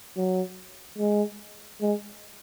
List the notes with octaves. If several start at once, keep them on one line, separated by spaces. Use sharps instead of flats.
F#3
G#3
G#3